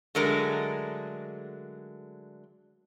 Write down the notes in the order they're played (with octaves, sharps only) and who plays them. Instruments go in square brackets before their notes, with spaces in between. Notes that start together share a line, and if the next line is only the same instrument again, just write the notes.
[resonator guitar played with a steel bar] D3 F#3 G#3 A3 A#4